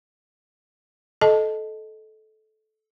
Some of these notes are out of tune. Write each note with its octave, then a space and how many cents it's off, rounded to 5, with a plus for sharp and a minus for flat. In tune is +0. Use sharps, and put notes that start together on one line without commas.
A4 -20 D#5 +0 A5 +0